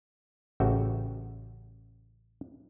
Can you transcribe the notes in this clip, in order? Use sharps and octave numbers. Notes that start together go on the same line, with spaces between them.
A1 C#3 F#4 E5 G5